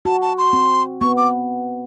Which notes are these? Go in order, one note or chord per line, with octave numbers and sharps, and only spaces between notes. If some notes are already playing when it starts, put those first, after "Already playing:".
F#4 A5
A5
C6
C4
B3 C#6
D6